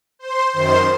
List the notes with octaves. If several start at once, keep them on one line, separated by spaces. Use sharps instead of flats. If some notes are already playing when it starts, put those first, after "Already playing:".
C5 C6
F#2 D#3 C5 C6